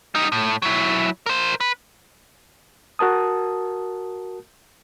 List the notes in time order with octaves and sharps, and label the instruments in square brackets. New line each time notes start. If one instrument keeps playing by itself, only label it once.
[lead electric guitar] G3 D#4
A2
F#3 E4
A#4 C5
B4
[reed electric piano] F#4 A#4 A5 D#6